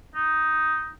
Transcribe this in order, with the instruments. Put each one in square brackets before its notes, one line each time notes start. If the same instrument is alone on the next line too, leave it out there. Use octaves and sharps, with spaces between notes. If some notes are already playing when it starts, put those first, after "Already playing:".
[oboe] D#4